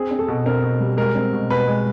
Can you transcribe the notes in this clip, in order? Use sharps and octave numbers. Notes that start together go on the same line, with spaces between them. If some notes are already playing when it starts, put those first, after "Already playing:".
Already playing: C4 G#4
C4
A4
B2
C4 A#4
B2
G3
G#3 A#4
C4
B2
B2 B4
G#3